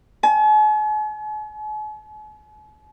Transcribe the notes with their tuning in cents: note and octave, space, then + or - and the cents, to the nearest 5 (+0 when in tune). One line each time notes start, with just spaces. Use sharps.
G#5 +45